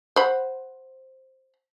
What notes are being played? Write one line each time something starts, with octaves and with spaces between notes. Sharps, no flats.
C5 F#5 B5